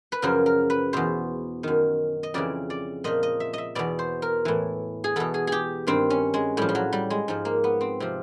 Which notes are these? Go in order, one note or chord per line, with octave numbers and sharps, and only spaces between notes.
B4
F#2 C#3 F3 A#4
A#4
B4
E2 B2 C5
F#2 D#3
D#5
F2 C#3 E3 D5
D5
A#2 F3 D#5
D#5
E5
D#5 E5
E2 B2 D5
C5
A#4
A2 E3
G#4
E2 B2 A4
G#4
G4 G#4
G2 D#3 C4
C#4
G#3
A2 F3 G3
F3
F#3
G3
G#3
G#2 F3
A#3
B3
C4
C3 F3